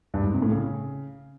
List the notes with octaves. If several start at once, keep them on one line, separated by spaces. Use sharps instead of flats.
G2
G#2
C3
A2
C#3